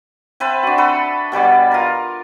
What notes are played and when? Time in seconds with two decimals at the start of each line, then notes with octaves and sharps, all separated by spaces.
0.40 C4 B4 E5 A5
0.63 D4 F#4
0.78 A4 B4 B5
1.32 B2 G3 B4 D5
1.71 F4 A#4